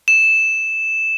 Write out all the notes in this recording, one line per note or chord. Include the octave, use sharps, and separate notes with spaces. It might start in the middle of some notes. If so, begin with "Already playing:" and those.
E7